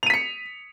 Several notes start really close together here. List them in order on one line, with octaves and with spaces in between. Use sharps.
F7 D#7 B6 C#7